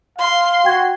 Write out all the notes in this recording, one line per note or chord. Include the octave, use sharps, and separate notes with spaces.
F5 C6
F#4 G5 G#6